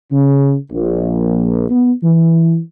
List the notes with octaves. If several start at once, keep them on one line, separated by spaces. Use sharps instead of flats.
C#3
A#1
B3
E3